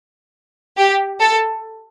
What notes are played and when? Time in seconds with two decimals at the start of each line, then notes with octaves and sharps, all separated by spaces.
0.77 G4
1.20 A4